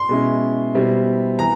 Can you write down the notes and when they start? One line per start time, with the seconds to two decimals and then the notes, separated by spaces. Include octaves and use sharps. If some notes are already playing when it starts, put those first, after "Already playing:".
Already playing: C6
0.09 B2 G#3 C#4 E4
0.74 B2 G3 C4 E4
1.39 E3 A#5